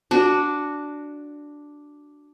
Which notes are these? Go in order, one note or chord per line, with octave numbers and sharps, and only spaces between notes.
D4 F#4